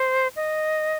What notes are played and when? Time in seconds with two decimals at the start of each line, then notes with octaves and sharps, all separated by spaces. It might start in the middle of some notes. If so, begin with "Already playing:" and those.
Already playing: C5
0.36 D#5